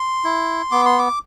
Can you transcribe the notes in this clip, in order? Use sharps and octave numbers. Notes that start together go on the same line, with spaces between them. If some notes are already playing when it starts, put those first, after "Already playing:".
Already playing: C6
E4
B3 D6
C6
D6